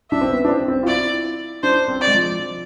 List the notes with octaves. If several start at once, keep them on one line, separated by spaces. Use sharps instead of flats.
D4 E5
C4
B3
D4
C4
C4
F4
E4 D5
D4 C5
C4
D5
G#3
F3
F3